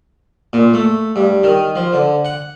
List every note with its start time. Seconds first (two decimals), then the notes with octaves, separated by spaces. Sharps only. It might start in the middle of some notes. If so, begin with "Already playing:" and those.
0.53 A#2
0.73 A3
1.16 G2
1.43 D#3
1.75 F3
1.93 D3
2.25 F#5